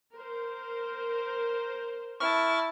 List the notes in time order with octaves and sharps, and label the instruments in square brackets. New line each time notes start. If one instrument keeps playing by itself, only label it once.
[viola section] A#4 C5
[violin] E4 A5 [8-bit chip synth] C#6 F6